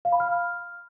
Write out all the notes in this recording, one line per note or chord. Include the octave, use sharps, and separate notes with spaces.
F5
B5
F6